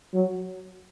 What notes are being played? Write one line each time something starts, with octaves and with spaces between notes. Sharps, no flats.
F#3